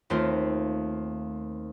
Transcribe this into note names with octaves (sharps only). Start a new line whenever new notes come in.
D#2 A3 C4 F4